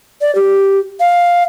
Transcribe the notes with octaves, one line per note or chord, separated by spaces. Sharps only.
D5
G4
F5